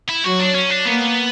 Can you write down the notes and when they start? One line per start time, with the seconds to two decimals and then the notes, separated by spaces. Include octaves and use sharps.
0.09 E4
0.24 F#3 F#4
0.39 D4
0.55 C#4
0.70 D4
0.85 A#3 B3